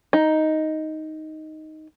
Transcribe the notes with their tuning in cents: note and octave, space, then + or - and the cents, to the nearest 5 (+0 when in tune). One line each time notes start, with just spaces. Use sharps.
D#4 +5